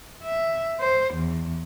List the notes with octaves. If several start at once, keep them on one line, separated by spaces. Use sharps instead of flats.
E5
C5
E2